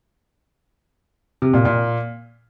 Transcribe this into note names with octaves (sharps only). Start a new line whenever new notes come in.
C3
A#2
A#2